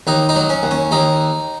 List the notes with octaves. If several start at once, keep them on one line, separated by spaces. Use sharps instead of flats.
D#2 D#4
D#4
F#3
C#4
D#2
C#4
D#2 D#4